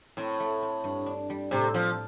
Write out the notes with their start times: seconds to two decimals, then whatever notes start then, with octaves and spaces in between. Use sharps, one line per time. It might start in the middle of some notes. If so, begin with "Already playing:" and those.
0.17 A2 C4
0.40 A3
0.62 C4
0.84 G2
1.06 D4
1.30 G3
1.51 A2 C3
1.74 F3 C4